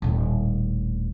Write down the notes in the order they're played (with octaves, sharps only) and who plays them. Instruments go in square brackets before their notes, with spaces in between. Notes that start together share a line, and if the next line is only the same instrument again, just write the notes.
[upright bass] D#1 A2